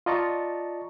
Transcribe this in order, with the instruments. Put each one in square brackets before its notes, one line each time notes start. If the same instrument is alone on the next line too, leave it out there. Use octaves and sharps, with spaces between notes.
[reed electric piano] F4 D5 D#5 A5 A#5 C#6